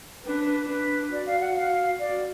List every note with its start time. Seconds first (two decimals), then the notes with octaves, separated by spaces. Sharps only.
0.25 D4 B4
0.47 B4
0.68 D4 B4
1.12 F#4 D5
1.27 F5
1.41 F#5
1.56 F5
1.99 F#4 D5